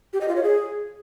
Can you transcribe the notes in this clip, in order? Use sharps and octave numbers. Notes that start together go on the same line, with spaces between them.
G4
D#5
F4
C#5
G#4